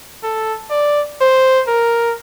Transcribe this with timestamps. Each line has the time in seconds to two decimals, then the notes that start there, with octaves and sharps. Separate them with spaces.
0.23 A4
0.70 D5
1.21 C5
1.68 A#4